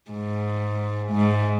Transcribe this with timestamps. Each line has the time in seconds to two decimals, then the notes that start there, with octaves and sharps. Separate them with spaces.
0.11 G#2
1.12 G#2